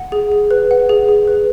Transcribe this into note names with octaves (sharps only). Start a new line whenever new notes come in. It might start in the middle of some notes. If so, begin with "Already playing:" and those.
Already playing: F#5
G#4
G#4
B4
F#5
G#4
G#4
B4